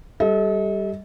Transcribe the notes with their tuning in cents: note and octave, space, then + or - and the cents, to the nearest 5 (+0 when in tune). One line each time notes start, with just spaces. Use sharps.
G3 +0 A4 -20 D#5 +40